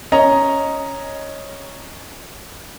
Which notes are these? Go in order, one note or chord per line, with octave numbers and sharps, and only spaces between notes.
C#4 D#5 A#5